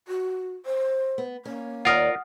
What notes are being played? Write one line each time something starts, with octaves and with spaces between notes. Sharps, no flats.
F#4
C5
B3
A#3 C#4
D#2 F4 A#4 D5 F#5 D#6 F6